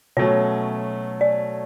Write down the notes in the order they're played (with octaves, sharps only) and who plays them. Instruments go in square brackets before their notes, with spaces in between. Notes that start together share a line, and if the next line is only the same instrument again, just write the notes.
[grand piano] B2 F#3 A3 C#4 [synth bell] C#5
[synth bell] D5